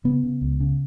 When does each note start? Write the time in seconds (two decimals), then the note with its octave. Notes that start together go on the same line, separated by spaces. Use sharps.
0.04 C#3 B3
0.23 C#3
0.41 C#2
0.60 C#3